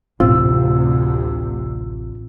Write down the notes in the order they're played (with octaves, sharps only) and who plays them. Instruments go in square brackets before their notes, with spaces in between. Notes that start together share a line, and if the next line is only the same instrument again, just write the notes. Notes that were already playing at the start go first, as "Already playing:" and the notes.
[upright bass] A1 [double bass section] D2 C3 [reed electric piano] C4 F4 [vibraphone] E6